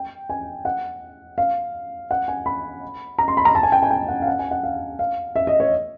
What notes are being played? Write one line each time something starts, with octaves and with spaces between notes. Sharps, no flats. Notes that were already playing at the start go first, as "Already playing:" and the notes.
Already playing: G5
G#5
F#5
F5
F#5
G#5
B5
A#5
C6
B5
A#5
A5
G#5
G5
G#5
G5
F#5
F5
F#5
G#5
F#5
F5
F5
E5
D#5
C#5